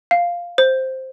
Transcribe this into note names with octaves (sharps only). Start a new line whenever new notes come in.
F5
C5